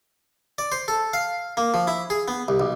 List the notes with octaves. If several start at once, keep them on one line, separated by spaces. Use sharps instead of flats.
D5
C5
A4
F5
A#3
F3
E4
G#4
B3
C2
B1